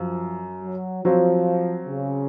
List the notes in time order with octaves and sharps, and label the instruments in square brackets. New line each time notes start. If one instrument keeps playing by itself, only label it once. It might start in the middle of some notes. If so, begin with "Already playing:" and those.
Already playing: [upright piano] F#2 [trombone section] F3
[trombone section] F#3
[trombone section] F3 [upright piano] F#3 C4 F4 C5
[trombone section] C#3